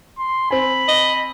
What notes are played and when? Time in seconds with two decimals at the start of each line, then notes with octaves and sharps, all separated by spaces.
0.19 C6
0.51 C4 G#5 B5
0.88 D#5